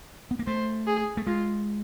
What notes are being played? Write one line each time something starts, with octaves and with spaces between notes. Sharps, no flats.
B3
A#3
A3 C5
G#4
A3
G#3 F4